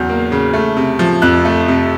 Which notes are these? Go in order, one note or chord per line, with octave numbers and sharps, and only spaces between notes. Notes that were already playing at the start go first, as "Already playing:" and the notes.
Already playing: E2 C#3 F#3 G6
A#3
C#3
A3
C3
F3
F2 F#6
A3
C3